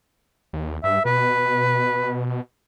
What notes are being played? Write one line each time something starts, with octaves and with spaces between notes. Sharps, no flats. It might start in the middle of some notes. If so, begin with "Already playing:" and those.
D#2
G2 E5
B2 B4